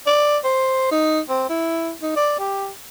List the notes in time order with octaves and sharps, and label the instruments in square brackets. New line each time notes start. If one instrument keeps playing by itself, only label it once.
[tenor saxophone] D5
C5
D#4
C4
E4
D#4
D5
G4